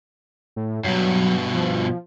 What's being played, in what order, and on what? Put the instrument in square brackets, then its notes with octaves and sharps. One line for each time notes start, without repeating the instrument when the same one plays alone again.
[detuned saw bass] A2
[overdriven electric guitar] G2 B2 [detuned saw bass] F#3
[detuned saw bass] F3